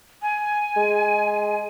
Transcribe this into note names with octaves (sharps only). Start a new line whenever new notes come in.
G#5
G#3